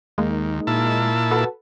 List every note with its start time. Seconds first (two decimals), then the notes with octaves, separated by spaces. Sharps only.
0.18 D#2 G#3 A#3 D#4
0.67 A#2 E4 A5
1.31 F#4 A4 B4